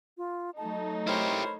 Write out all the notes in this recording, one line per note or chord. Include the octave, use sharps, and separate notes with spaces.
F4
F#3 A3 D#4 A5
E4 G4 A#4 C5 C#5 B5